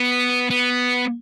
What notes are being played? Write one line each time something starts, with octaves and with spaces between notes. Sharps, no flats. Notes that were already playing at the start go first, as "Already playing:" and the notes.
Already playing: B3
B3